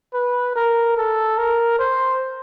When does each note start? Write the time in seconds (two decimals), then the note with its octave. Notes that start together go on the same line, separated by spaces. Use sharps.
0.14 B4
0.56 A#4
0.97 A4
1.38 A#4
1.79 C5